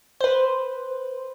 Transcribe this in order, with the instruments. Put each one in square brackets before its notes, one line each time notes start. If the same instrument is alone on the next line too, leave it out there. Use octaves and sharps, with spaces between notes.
[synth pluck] B4 C5